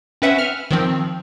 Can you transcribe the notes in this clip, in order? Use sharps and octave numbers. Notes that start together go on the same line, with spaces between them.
C4 C#4 B4 E5 F#5
F6
D#3 F3 C4